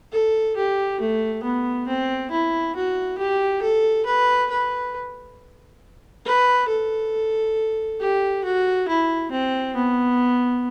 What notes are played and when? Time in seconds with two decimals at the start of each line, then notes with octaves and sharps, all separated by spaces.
0.12 A4
0.56 G4
1.00 A3
1.43 B3
1.87 C4
2.31 E4
2.75 F#4
3.18 G4
3.62 A4
4.06 B4
4.50 B4
6.25 B4
6.68 A4
8.00 G4
8.44 F#4
8.88 E4
9.31 C4
9.75 B3